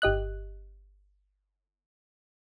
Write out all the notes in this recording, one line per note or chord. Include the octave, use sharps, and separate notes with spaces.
G1 G4 D#5 F#6